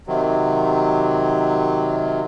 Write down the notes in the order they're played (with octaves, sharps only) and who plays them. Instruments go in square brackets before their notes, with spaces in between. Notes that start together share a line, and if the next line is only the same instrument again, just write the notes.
[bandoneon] C3 D#3 F#3